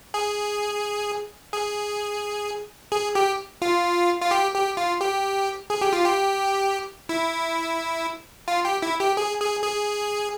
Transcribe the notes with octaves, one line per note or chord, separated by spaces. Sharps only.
G#4
G#4
G#4
G4
F4
F4
G4
G4
F4
G4
G#4
G4
F4
G4
E4
F4
G4
E4
G4
G#4
G#4
G#4